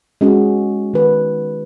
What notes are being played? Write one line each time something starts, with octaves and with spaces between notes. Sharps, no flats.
G#3 C#4 F#4 G#4
D#3 B4